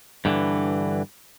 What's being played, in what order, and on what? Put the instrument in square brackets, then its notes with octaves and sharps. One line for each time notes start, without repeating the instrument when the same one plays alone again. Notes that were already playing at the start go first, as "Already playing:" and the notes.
[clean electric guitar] G2 D3 E3